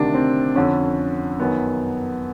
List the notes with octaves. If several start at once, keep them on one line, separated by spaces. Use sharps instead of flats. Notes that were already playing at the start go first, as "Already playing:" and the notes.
Already playing: D2 C3 D#3 D4
C4
F2 D3 C#4
F#2 D#3 B3